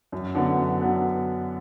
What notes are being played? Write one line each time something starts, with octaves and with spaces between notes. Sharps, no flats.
F#2
D3 F#3 B3
F#2
D3 F#3 B3